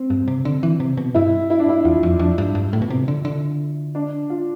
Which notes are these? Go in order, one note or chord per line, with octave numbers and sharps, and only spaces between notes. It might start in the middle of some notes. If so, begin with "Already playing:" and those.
Already playing: C4
G2
C3
D3
E3
C3
B2
G2 E4
E4
D4
E4
E2 F4
F2
F2 D4
G2
G2
A2
B2
C3
D3
D3
D4
F4